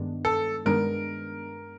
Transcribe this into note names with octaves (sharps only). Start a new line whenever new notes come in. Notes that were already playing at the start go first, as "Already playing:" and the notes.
Already playing: G2 D#3 G#3 B3 D4
A4
G2 D#3 G#3 B3 D4 A#4